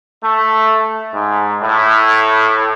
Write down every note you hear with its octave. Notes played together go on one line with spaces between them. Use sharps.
A3
G#2
A2